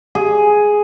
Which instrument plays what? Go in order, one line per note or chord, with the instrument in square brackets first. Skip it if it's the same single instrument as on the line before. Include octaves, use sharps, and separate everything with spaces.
[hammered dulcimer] G#4